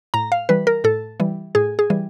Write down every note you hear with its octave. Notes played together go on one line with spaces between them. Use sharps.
A2 A#5
F5
E3 G3 B4
A#4
A2 A4
E3 G3
A2 G#4
G#4
E3 G3